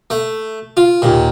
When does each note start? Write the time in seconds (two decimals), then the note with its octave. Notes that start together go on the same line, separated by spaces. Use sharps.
0.10 A3
0.77 F4
1.02 D#2 A#2